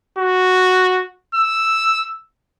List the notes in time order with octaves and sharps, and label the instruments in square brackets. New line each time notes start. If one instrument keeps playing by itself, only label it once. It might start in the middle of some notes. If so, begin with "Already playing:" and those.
[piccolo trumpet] F#4
E6